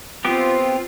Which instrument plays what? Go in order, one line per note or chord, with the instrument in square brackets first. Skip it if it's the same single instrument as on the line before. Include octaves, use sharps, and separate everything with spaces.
[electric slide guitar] B3 G4 [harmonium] C4 [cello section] F4